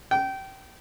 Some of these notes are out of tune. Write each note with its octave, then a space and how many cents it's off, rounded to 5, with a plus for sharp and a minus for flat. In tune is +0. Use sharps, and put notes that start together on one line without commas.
G5 -25